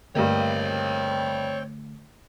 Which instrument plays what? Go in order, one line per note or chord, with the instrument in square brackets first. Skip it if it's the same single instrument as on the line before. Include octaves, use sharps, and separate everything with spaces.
[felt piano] G2 A#3 [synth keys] D3 A3 [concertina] C4 G5 [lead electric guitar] C#5 D#5